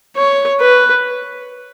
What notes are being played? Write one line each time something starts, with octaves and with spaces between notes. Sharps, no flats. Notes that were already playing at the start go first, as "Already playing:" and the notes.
C#5
B4